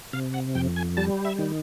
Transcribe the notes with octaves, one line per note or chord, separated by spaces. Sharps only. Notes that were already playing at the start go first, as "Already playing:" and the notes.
C3 F5
F#5
F2 G5
G#5
G3 A5
E5
D#3